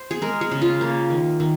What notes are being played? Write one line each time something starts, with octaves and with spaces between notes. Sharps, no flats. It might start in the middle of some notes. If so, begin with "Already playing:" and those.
Already playing: C5
G#4
G#3 A#4
G#4
C#3
F4
A#3
D#3
D#3